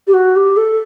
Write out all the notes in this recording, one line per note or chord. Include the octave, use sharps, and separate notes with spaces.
G4
F#4
G4
A4